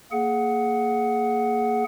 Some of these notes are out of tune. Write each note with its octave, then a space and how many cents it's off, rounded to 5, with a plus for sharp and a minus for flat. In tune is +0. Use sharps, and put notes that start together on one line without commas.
A#3 -10 G#4 +20 F#5 +0